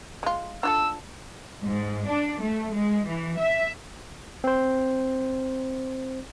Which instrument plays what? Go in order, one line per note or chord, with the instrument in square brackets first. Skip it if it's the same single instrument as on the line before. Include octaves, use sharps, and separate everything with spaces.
[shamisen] G#3 F4
[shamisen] D4 F4 A4 [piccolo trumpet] E6
[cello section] G#2
D4
A3
G#3
E3
E5
[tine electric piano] C4 C5